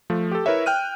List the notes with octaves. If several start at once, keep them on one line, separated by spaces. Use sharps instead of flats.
F3 A3
G4 A4
E4 A#4 B4 C#5 E5
G5 F6 F#6 D#7